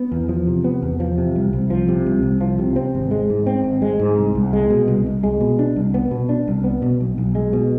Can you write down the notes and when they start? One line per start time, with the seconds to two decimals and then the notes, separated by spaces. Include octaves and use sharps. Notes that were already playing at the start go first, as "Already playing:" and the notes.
Already playing: B3
0.12 E2
0.29 F3
0.47 C3
0.64 B3
0.82 E2
1.00 F3
1.18 C3
1.36 C2
1.53 C2
1.70 F3
1.88 C3
2.06 C2
2.23 C2
2.41 F3
2.59 C3
2.76 C4
2.95 G#1
3.11 G#3
3.30 G#2
3.46 C4
3.64 G#1
3.82 G#3
3.99 G#2
4.18 C2
4.35 C2
4.53 G#3
4.70 B2
4.88 C2
5.06 C2
5.24 G#3
5.40 B2
5.59 D4
5.76 C2
5.94 B3
6.11 B2
6.29 D4
6.48 C2
6.64 B3
6.82 B2
7.01 B1
7.18 B1
7.35 G#3
7.53 B2